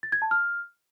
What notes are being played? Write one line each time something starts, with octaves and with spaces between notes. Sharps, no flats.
A6
G#6
A5
F6